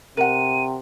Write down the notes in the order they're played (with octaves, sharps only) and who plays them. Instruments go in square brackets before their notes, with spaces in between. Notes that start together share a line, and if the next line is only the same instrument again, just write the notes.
[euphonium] C3 [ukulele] A#4 F#5 [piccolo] D#7